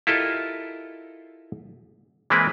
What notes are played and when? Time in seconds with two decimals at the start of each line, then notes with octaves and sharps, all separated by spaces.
0.07 E4 F4 G4 A4 A#4 D#5
2.30 E3 G#3 A#3 C4 E4 B4